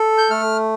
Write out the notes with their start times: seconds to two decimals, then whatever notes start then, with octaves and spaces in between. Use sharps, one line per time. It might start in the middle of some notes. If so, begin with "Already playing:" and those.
Already playing: A4
0.18 G6
0.30 A3 F6